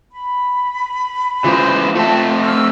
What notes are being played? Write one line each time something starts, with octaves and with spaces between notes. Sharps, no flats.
B5
C#3 E3 G#3 F4 C5 D6
A3 C4 F4 E5 G5 A5
C6 C#6 E6 F6